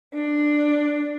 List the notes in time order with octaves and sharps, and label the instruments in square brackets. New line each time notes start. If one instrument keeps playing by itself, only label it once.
[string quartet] D4